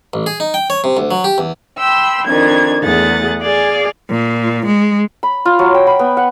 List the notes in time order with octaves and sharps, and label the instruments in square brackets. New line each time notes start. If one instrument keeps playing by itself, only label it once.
[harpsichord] A1
G#4
D#4
G5
C#5
C3
D2
F#3
G4
E2
[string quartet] G5 B5 C6 E6
F2 D#3 D4 G#6
E2 A3 G#4 F#5 A6
G#4 D5 F5 G#5
[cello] A#2
G#3
[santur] B5
F4
F#3
G5
B5
B3
F#5